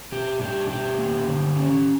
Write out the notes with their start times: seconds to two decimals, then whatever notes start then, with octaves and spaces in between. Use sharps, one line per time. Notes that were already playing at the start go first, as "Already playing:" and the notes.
0.12 B2 G4
0.41 D4 G4
0.69 B2 G4
0.99 A#3
1.28 D3
1.56 C#4